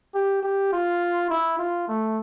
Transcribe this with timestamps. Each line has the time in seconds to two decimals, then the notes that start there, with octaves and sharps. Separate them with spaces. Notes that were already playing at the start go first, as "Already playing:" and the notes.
0.15 G4
0.43 G4
0.73 F4
1.30 E4
1.59 F4
1.88 A3